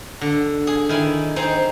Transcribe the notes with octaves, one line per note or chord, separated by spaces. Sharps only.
D3
G#4
D#3 E4 G#5
C4 D#4 G#4 C5